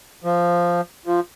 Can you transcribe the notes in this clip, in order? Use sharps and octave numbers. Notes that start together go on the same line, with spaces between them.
F3
F3